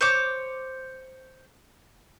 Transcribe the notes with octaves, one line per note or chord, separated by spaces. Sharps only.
C5 C#5 D6